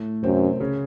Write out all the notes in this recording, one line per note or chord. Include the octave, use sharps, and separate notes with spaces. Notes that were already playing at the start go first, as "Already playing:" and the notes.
Already playing: A2 A3
F#2 C3 C4
C#3 C#4